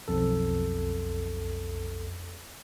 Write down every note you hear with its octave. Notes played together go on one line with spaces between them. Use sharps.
B1 F2 A4